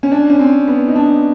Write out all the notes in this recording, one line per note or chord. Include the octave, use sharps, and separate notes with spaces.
C#4
D4
C#4
C4
B3
D#4
D4